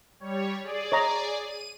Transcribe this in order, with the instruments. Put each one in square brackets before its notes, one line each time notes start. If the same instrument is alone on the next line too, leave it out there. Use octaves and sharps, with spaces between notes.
[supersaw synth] G3 C#5
G#4 D5
[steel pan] C#5 D#5 A#5
[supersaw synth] D#7